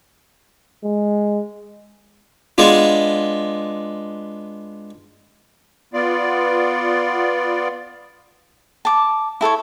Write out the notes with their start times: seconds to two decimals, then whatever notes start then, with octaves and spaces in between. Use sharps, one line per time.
0.84 G#3
2.58 G#3 B3 D4 F4
5.94 B3 F4 D5
8.85 A5 D6
9.41 E4 A4 C5 C#5